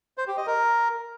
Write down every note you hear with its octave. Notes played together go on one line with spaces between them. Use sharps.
C5
G4
D#5
A#4